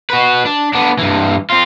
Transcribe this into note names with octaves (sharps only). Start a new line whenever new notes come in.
F#4 B4
D4
B3 D4
G2 E3
C4 F4